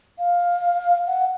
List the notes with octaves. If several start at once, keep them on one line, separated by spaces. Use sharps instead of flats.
F5
F#5